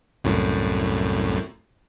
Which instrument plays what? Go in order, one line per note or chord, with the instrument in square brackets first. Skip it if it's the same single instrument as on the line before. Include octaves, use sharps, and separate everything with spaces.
[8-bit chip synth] C2 F#2 A2